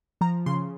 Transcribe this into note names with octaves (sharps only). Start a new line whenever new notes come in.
F3 A#5
C#3 C6